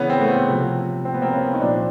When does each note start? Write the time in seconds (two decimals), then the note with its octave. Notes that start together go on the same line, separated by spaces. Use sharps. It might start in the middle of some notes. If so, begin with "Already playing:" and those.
Already playing: C#3 E3 B3 C#4
0.10 C4
0.21 A3 B3
0.49 C3 F3
1.05 C4
1.14 B3
1.22 A#3 C4
1.33 B3 C#4
1.54 D#4
1.61 A#2 F3 C4 D4